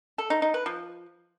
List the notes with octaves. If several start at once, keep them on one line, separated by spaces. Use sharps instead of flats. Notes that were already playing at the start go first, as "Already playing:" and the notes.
A4
D#4
D#4
B4
F3